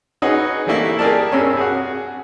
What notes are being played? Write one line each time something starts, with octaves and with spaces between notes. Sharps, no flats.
C#4 D#4 F#4 G#4 B4
E3 G3 A3 A#3 E4
G4 G#4 A#4 D5 A5
G2 C3 C#4
F#4 G#4